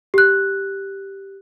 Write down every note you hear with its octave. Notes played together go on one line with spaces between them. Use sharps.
G4 F#6